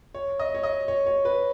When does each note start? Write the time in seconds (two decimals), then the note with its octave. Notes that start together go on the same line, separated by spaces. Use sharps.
0.14 C#5
0.40 D#5
0.55 C#5
0.64 D#5
0.88 C#5
1.06 C#5
1.25 B4